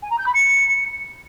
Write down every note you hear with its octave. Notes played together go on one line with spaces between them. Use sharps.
G#5
A#5
G6
B5
C#7